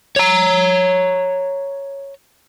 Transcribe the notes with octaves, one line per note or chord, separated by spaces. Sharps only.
C#5 A#5